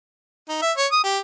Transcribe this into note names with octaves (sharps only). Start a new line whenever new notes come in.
D#4
E5
C#5
D#6
G4